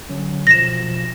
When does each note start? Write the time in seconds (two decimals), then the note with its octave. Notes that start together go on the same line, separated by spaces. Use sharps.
0.09 D3 F#3 C#4
0.47 B2 F3 A#6 E7